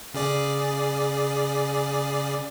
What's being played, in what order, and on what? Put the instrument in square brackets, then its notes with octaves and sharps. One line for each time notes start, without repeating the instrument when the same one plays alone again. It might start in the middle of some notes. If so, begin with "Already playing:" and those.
[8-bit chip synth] C#3 G#4 D5